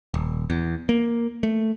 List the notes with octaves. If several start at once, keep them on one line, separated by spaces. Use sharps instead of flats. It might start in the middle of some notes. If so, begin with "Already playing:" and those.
D#1
E2
A#3
A3